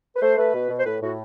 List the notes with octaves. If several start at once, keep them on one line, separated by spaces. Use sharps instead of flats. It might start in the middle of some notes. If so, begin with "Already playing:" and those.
B4
A3 C5
A3 B4
B2
B2
C5
A2 B4
A2 F#4